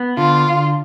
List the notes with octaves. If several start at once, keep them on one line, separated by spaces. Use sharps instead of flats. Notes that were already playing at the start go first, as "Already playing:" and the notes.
Already playing: B3
D3 F4